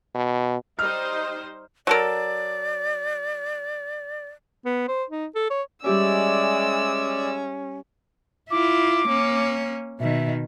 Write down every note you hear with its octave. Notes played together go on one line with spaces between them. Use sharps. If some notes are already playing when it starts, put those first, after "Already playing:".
B2
G3 D#4 C5 D#5 F6
F#3 A4 A#4 D5
B3
C5
D#4
A4
C#5
G3 G#3 C#4 G4 D5 E5 E6
E4 F4 D6
A#3 C#4
B2 D#3 E5